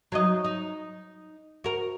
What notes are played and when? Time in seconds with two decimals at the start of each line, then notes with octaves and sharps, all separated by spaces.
0.12 F#3 D#4 D#5
0.44 D#4
1.64 F#4 A#4